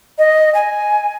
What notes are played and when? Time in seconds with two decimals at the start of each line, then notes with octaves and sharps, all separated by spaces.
0.19 D#5
0.54 G#5